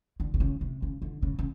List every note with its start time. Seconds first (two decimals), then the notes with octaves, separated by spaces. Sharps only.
0.20 D3
0.34 C3
0.40 C#3
0.61 C3
0.82 C#3
1.02 D3
1.22 C#3
1.39 C#3